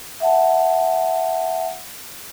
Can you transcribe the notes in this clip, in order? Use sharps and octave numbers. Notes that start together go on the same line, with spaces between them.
E5 F#5 A5